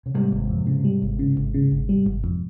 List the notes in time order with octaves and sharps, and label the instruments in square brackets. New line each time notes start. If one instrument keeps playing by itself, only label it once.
[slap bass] C#3
[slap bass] G#2 C3 [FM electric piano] G3
[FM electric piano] G1
F2
C#3
G3
G1
C#3
G1
C#3
G1
G3
G1
F2